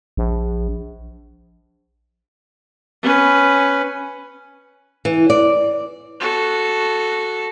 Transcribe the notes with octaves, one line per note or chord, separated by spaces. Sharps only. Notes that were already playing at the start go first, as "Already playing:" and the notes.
A#1
C#4 B4
E3
D5
F#4 A4